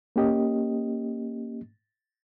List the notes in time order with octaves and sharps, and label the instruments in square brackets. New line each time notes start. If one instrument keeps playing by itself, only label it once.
[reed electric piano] A#3 C#4 G4 D#5